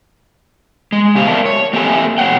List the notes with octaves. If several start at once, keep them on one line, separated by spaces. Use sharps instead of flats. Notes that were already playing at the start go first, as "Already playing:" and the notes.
G#3
C#3 B3 G4 C5 F5
A#4 D5 E5 A5
C#5
A#3 C4 G4 A4 E5 G#5
B2 F3 C#5 F#5 G5